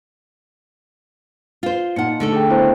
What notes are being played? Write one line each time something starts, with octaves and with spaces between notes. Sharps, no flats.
F4 C5
A#2 D#4 F#5 C#7
D3 A3 A4
G#4 G5
B3 E4 C5